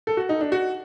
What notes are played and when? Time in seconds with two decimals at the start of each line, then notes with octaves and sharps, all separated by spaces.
0.07 A4
0.17 F#4
0.29 D#4
0.41 D4
0.52 F#4